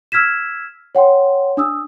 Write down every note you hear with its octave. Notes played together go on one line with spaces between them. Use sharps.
E6 F6 G#6 B6 E7
C#5 F#5 G5 C6
D4 D#6 E6